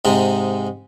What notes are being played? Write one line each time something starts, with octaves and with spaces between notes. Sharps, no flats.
G#2 C3 G#3